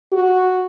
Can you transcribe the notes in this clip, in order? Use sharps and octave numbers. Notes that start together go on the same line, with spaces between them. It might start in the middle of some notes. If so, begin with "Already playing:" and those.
F#4